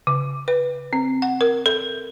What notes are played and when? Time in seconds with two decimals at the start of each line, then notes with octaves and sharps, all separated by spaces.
0.07 C#3
0.48 B4
0.93 C4
1.22 F#5
1.41 A#4
1.66 A4